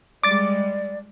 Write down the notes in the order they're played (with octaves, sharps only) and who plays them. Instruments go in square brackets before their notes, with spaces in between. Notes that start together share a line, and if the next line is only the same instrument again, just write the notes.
[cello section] G3 G#3 [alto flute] D5 [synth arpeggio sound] D6 A6 D7